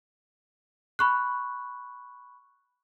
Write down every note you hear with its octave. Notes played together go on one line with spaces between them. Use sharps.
B5 C#6 F#6